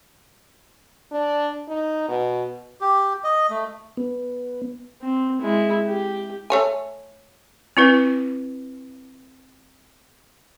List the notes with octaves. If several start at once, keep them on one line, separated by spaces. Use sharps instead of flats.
D4
D#4
B2
G4
D#5
A3
B3
C4
G#3 E4
G4
A3 C#5 G#5
C4 E4 B4